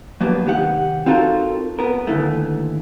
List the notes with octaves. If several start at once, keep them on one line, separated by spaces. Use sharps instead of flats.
F#3 A#3 B3 D4 G4
C3 D#3 G4 C#5 F#5
C4 D#4 F4 F#4 A4 A#4
B3 A#4
D#2 A2 D3 E3 A3